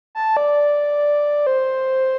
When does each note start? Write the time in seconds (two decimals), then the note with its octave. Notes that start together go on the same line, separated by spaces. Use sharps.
0.15 A5
0.37 D5
1.47 C5